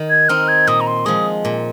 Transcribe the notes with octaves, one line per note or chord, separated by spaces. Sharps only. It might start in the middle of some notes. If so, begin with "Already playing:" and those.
Already playing: D#3
G#6
C4 D#4 F6
G#6
A#2 D#6
A#5
C6
F3 G#3 D#6
A#2